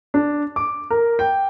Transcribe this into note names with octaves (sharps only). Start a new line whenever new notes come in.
D4
D6
A#4
G5